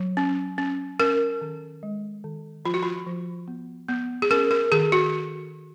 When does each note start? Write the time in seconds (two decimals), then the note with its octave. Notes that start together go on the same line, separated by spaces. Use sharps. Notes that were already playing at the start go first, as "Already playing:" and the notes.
Already playing: F#3
0.17 C#4
0.58 C#4
1.00 C#4 A#4
1.41 D#3
1.83 G#3
2.24 D#3
2.65 F3 F4
2.74 F#4
2.83 F4
3.06 F3
3.48 B3
3.88 B3
4.22 G#4
4.31 C#4 A#4
4.51 A#4
4.72 D#3 G#4
4.92 F#4